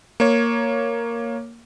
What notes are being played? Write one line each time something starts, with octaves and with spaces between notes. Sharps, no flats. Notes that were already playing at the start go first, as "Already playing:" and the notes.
A#3 C#5